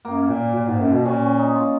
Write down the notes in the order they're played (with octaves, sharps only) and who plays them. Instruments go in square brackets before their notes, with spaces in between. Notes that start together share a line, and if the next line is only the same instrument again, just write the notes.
[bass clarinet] F#2 [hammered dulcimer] A#3
[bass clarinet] A#2
A#2
G#2
F#2
B2
[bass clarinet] A#2 [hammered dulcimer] C#4
[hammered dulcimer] C#4
D#4
F4